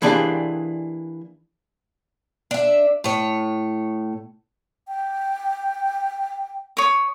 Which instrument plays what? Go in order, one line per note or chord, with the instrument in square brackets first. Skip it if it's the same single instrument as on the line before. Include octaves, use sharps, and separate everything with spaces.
[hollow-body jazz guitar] E3 A#3 D4 G4 G#4
[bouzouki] D4 E5
A2 C#5
[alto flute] G5
[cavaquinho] C#5 D#6